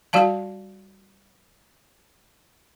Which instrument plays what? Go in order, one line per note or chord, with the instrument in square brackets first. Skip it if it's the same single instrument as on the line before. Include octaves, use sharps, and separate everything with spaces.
[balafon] G3 F#4 D5 F5 A5